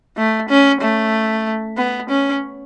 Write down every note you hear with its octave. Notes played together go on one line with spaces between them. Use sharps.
A3
C#4
A3
B3
C#4